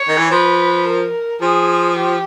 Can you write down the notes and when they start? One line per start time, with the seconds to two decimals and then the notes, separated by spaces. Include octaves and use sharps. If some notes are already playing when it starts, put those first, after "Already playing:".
Already playing: C#5
0.08 D#3
0.17 E3
0.31 F3 B4
0.87 A#4
1.41 F3 G#4
1.96 G4